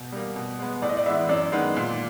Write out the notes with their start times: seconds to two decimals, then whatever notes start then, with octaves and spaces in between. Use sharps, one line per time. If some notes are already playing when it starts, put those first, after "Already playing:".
Already playing: B2
0.12 G3 A#3
0.36 B2
0.59 G#3 B3
0.82 A2 D5
0.89 D#5
0.97 D5
1.06 E3 G#3 B3 E5
1.29 F#2 D5
1.52 D#3 G#3 B3
1.77 A#2